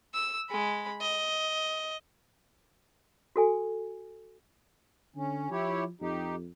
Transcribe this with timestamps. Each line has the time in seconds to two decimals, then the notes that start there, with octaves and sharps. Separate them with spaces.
0.14 E6
0.49 G#3 B5
1.01 D#5
3.36 F#4 A4 G#5
5.16 D3 C#4
5.51 F3 E4 G4 C#5
6.01 F2 D#4 G4